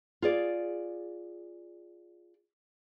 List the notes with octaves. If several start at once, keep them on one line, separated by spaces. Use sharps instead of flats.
F4 G#4 D5